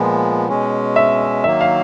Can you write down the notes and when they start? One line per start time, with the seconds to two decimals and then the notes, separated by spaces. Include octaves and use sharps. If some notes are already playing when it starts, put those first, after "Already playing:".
Already playing: A#2 F3 G#3 B3
0.49 B2 G#3 C#4
0.96 E5
1.44 D#3 F#3 A#3 E5
1.61 F5